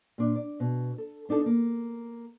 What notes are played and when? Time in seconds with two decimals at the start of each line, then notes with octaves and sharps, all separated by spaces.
0.18 A#2 D4
0.35 D5
0.60 B2
0.98 A4
1.29 B3 D4 D#4 A4
1.46 A#3